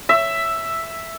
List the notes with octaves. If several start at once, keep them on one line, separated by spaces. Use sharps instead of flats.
E5